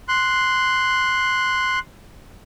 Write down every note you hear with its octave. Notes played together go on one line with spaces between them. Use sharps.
C6 F#6